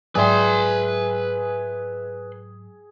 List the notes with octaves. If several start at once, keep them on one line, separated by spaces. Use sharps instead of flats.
G#2 F#3 G#4 B4 D5 E5 G5 C6